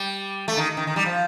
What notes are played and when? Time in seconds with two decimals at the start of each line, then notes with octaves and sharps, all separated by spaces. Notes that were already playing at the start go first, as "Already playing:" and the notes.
Already playing: G3
0.48 A3
0.57 D#3
0.77 D#3
0.87 D#3
0.96 G3
1.06 F3